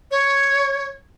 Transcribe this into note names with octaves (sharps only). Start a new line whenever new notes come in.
C#5